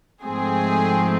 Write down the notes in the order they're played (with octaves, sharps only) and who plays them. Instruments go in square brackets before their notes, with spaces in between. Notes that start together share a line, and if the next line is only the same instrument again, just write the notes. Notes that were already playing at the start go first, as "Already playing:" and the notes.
[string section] G#2 F3 A3 C4 G#4